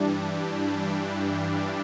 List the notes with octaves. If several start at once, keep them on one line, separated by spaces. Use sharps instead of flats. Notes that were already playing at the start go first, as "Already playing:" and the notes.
Already playing: G2 E3 G3 D4
D4